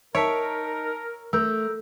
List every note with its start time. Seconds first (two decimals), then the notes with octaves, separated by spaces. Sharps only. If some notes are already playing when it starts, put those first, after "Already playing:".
0.15 D#4 A#4 C#5 E5 A5 B6 D7
1.33 A3 A#4 E6 G6